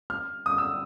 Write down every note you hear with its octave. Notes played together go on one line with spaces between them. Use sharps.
F6
D#6
E6